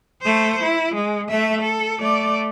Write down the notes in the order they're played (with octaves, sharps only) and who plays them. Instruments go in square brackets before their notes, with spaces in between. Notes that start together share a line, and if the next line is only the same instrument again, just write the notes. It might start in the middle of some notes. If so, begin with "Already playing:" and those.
[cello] A3 C5
E4
G#3
A3 E5
A4
A3 D5